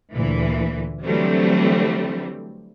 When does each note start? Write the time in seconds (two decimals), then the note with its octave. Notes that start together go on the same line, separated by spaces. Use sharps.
0.13 D2 A#2 E3
1.04 D3 E3 F#3 G3 A3 C4